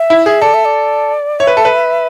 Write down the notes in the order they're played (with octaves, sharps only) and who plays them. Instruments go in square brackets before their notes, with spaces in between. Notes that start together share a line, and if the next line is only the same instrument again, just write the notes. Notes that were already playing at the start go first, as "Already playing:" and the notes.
Already playing: [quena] E5
[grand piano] E4
G#4
[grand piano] A4 [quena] D5
[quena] E5
D5
[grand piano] C#5 [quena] E5
[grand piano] B4
A4
B4